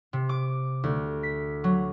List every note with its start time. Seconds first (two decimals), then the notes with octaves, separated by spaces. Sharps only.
0.13 C3
0.29 D6
0.84 D2
1.23 B6
1.64 F#3